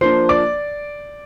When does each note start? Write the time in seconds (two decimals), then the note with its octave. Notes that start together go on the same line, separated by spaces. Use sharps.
0.01 F3 A#3 D4 C5 C6
0.29 D5 D6